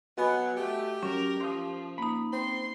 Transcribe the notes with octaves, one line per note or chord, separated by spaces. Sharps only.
F#3 B3 F#4 D#5 G#5 B5
A3 G4
F#3 C#4 A#4
F3 C6 D#6
A#3 D#4 B5
C4 C6